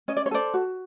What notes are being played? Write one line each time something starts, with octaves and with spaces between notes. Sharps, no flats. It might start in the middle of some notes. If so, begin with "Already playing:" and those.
C#4 D#5
D5
C#5
A4 C5 D5
F#4